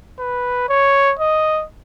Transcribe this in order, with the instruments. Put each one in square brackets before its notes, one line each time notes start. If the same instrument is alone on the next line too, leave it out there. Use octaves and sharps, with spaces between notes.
[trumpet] B4
C#5
D#5